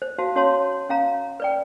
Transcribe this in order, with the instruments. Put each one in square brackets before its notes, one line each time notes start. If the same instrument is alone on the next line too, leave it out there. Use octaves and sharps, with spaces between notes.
[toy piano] C5
F#4 C5 F5 A5
C#4 F#4 C#5 F5 A5 C6
C#4 F5 A#5
B4 D5 G5